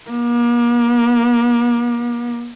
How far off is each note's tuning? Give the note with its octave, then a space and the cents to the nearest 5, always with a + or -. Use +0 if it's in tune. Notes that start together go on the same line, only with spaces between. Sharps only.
A#3 +40